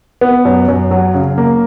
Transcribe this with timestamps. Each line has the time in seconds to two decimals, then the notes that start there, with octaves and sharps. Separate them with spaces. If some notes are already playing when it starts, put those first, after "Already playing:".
0.21 B3
0.45 F#2
0.68 F#2
0.91 F#3
1.14 C#3
1.38 A#3